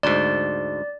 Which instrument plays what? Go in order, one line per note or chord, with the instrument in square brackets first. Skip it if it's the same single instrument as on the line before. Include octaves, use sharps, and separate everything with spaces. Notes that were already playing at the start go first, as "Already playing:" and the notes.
[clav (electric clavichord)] D2 G#2 [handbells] D5